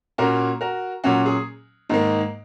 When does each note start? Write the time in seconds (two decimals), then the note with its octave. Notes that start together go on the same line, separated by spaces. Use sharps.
0.18 A#2 A#3 C#4 F#4 A#4
0.61 F#4 A#4
1.04 A#2 F#3 C#4 F#4
1.26 G#4
1.90 G#2 D#3 A#3